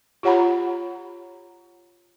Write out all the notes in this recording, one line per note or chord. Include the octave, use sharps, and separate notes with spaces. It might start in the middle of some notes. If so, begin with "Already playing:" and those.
F4 G4 C#5 F#5 A#5 B5